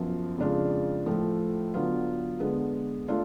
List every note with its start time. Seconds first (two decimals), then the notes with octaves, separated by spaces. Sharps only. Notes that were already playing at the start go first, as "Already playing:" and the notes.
Already playing: F#2 F3 B3
0.38 F2 C#3 G#3 D4 F4
1.06 A2 F3 A3
1.74 D3 F#3 B3 F4
2.40 D3 G#3 B3
3.08 A3 D4 F4